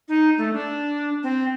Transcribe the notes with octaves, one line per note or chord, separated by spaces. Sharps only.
D#4
A3
D4
C4